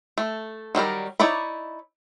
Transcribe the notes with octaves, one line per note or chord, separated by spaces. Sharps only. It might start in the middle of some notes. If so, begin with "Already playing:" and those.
A3
D#3 F#3 G3 A#4
D#4 E4 C#5 D5 B5